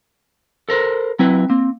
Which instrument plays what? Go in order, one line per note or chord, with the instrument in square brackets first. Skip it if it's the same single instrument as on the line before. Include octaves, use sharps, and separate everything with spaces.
[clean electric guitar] A4 A#4 C5
[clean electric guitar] F#3 E4 B4 [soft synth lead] C4
[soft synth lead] A#3 [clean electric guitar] C4